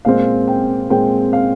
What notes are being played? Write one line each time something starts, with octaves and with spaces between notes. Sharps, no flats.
A#2 G#3 C4 F5
G5
A#2 G#3 C4 G5
F5